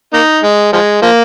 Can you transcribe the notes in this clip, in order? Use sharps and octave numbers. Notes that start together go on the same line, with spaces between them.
A#3 D#4
G#3
F3 G#3
F3 A#3